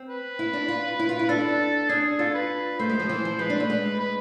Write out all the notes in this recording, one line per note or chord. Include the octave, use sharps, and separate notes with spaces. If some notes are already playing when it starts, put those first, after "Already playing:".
Already playing: C4
B4
E4
D4
F4
E4
F4
E4
D4 A4
D4 G#4
F4 A4
B4
A3 C5
G#3
F3
E3
F3
G#3 B4
D4
A3
G#3
B4